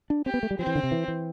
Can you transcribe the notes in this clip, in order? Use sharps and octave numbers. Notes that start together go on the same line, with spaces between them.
D4
C4 G4
B3
A3
G3
F3 C4
E3
D3
C3
E3
E3